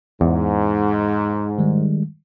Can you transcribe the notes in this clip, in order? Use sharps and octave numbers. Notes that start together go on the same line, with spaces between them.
E2 G#2
D#3 G3 G#3